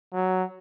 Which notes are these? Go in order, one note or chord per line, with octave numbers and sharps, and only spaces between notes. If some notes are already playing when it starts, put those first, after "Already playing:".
F#3